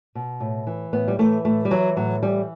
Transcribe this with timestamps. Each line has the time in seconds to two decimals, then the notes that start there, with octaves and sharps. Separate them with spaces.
0.15 B2
0.40 A2
0.67 E3
0.93 A2 B3
1.08 G3
1.19 E3 A3
1.45 A2 A3
1.65 G3
1.71 E3 F#3
1.96 A2 F#3
2.22 E3 G3